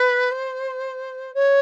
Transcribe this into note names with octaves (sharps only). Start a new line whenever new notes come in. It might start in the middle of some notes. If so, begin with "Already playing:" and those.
Already playing: B4
C5
C#5